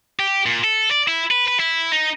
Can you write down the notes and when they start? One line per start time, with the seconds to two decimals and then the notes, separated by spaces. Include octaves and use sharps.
0.19 G4
0.46 A#2
0.64 A4
0.91 D5
1.08 E4
1.31 B4
1.48 B4
1.60 E4
1.92 D#4